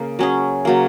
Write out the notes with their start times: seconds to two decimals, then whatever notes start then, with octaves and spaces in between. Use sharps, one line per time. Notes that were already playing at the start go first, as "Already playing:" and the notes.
Already playing: C#3 A#3
0.19 F#3 C#4 G#4
0.65 C#3 F#3 A#3